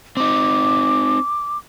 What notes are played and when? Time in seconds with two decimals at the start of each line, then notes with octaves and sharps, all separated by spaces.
0.17 C4 D#4 D6